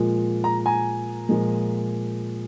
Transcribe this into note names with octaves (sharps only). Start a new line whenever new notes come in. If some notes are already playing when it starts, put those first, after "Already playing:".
Already playing: A#2 F3 G#3
A#5
G#5 A#5
A#2 F3 G#3